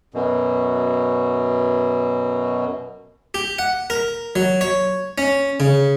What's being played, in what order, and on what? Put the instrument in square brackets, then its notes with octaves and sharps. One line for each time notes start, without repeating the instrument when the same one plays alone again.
[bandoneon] F#2 B2
[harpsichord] G4
F#5
A#4
F#3
C#5
C#4
C#3